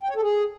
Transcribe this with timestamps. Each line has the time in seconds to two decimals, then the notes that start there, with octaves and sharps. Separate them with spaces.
0.03 G5
0.10 C#5
0.16 A4
0.22 G#4